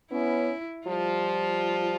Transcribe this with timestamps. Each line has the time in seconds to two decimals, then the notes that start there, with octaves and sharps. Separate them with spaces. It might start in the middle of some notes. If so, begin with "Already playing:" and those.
0.12 B3 C#4 E4
0.87 F3 G3 F4